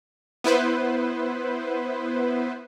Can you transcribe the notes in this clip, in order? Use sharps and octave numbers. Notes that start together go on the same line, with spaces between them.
B3 E4 B4 C5